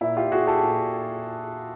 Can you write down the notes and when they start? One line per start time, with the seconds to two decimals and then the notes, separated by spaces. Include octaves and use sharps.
0.01 A#2 E4
0.16 F4 G4
0.32 F#4 G#4
0.47 G4 A4
0.63 A#2